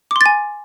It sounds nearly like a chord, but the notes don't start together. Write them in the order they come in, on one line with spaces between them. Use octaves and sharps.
D6 C6 A6 G#5